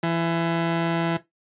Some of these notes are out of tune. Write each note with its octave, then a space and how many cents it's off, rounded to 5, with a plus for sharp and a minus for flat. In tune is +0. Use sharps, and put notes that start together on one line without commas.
E3 +25